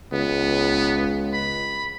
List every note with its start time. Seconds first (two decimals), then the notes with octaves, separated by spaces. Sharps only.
0.13 C#2 B3
1.33 B5